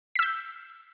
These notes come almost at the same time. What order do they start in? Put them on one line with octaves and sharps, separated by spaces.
B6 E6 G6